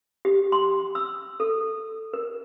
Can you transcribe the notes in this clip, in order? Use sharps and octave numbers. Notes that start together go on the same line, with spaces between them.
G4
C6
E6
A4
A#4